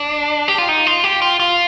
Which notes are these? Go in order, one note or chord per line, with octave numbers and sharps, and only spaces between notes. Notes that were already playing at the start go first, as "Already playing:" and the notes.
Already playing: D4
G4
F4
D#4
F4
G4
F4
F4